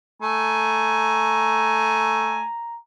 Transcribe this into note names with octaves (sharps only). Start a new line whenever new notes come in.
A3 G#5 A#5